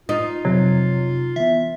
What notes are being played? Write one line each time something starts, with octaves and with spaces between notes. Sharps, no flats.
D#4 F4
F2 C3 F#3
E3 B3 E5